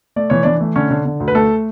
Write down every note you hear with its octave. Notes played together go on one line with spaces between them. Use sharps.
A3 D5
E3 C#5
E3 D4 D5
A3
D3 C#4 C#5
D3
D3
D2
B4
A3 A4